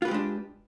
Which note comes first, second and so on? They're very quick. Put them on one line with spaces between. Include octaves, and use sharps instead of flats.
F4 B4 G4 G#3 D4